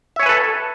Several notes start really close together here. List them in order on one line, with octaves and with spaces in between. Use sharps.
E5 C#5 G#5 B4 A4